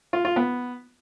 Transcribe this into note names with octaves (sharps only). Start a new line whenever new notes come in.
F4
F4
B3